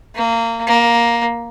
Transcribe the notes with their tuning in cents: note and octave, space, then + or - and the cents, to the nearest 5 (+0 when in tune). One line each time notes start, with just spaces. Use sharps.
A#3 -25
A#3 +10